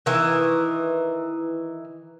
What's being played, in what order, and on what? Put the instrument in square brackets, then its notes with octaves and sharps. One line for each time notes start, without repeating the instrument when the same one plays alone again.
[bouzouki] D#3 E3 A#4